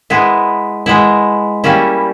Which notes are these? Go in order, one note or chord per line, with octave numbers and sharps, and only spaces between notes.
G#3 B3 E4
G#3 B3 E4
G3 A#3 C#4 E4